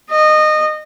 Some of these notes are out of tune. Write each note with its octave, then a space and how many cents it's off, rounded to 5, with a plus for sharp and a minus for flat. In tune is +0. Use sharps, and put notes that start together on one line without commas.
D#5 -20